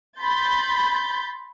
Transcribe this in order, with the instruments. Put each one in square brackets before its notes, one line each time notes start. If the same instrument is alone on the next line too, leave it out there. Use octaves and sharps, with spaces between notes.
[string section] B5 C6 G6 A6